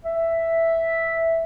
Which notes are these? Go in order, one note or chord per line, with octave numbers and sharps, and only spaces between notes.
E5